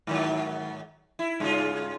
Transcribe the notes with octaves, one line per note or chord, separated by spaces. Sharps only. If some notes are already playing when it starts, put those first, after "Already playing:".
G#2 D#3 F#3
E4
G2 C#3 F4